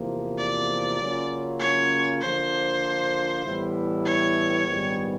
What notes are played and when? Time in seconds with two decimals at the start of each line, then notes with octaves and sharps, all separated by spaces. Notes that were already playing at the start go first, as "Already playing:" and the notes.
Already playing: E2 C3 F3 A#3
0.38 D5
0.99 C#3 F#3 A#3 C#4 F4
1.60 C#5
2.21 D3 F3 A#3 C5
3.44 A2 E3 G3 B3 E4
4.05 C#5
4.66 A#1 G#2 D#3 G3 B3